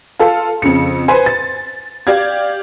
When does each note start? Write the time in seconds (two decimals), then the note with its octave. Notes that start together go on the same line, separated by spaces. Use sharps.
0.19 F4 A4
0.62 F2 C#3 C#7
1.08 B4 C5 G#5
1.26 A6
2.07 G4 D5 F5 G#6